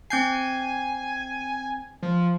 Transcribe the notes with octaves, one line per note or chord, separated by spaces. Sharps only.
C4 G#5 G6 C7
F3